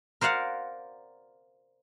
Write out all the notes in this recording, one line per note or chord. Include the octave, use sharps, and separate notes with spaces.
A#4 C5 D5 F5 F#5